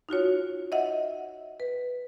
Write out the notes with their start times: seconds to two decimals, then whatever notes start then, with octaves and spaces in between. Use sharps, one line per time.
0.09 D#4 F4 F#4 C#5
0.72 D#5 E5 F#5
1.60 B4